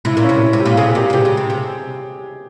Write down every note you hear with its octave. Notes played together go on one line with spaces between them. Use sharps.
C3 E4
A#2
C#4
C3
E4
C3
G4
A#2
C3 G#4
A#2 G4
C#3
C3 G4
C#3
C3
C3